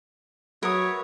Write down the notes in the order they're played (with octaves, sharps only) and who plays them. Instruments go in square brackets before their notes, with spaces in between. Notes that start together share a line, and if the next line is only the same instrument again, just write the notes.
[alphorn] F#3 [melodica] F#4 B4 E5 [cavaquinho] A#4 D#6 [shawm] C#5